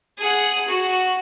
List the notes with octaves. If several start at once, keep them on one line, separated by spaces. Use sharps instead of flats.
G#4 F#5
F#4